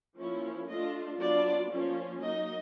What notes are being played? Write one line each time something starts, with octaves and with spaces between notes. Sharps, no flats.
F3 A#3 C#4 E4
A3 D4 F4 D#5
F#3 B3 D4 F4 D5
F3 A#3 C#4 F4
F#3 A#3 D#4 D#5